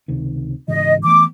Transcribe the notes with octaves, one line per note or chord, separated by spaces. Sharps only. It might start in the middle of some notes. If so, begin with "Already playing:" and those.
C#2 C3 D#3
G#2 C#3 E3 D#5
E3 A3 B3 D6